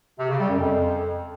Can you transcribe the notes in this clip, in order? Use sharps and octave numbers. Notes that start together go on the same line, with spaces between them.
C3
C#3
G3
F#2
F2